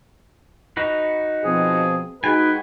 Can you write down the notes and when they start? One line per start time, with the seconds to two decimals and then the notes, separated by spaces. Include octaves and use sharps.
0.77 D#4 F#4 B4
1.44 B2 F3 C4 G#4
2.24 G#3 D#4 F#4 G#4 B4 G5 G#5